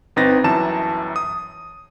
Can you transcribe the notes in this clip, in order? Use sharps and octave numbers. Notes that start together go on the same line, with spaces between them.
G1 C4 D#4 B4 A6 A#6
G1 F#2 E3 A5 A#5 E7
D#6